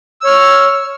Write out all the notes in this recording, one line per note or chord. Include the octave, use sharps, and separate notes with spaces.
C#5 E6 F6